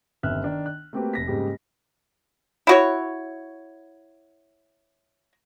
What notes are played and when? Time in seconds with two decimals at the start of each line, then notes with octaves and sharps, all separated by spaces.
0.23 G1 C3 D#3 E5 F6 F#6
0.44 D#3 D4
0.66 F#6
0.93 A3 A#3 C4 F#4 G4 B4
1.14 F1 A#6 B6
1.27 G#2 C#3 G3 A#3 G4
2.67 E4 F#4 C#5